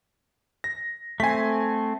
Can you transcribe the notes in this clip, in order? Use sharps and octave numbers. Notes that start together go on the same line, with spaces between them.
A#6
A3 C4 G#5 B6